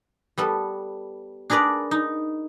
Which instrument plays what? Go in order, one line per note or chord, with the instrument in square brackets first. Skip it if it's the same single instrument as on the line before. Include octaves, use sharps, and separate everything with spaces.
[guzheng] G3 B3 A4
D4 G#4 A#4 B4 D5
D#4